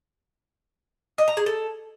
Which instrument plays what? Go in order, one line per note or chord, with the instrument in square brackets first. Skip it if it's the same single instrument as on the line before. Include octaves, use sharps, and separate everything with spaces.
[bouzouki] D#5
A#5
G#4
A4